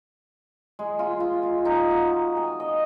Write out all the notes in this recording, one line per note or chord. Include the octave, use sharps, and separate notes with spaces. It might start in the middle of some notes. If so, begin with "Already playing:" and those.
G#3
F4
F4
F4
D#4
F#4
G#5
D#5